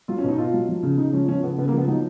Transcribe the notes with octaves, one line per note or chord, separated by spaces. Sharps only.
F#3 F4
C#4
B2 D#4
B2 F4
F#3
F3
C#3
C#3 D#4
F3 C#4
F3 C#4
C#3 B3
C#3 B3
A#3
F3
B3
F#3 D#4